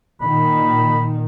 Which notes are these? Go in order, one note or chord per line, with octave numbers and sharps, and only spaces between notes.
A#2 D#3 B5